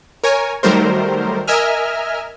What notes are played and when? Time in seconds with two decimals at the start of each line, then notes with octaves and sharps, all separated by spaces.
0.24 A#4 C#5 G#5
0.63 D#3 F#3 G3 A3 A#4 C5
1.48 A#4 D#5 E5 G#5 F6